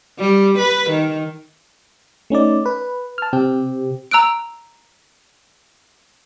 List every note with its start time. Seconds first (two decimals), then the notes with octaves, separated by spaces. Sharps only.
0.18 G3
0.58 B4
0.90 D#3
2.30 A3 C#4 D#4 D5
2.66 B4
3.18 A5 F6
3.33 C3 C4 G4
4.11 A#5 E6 F#6 D7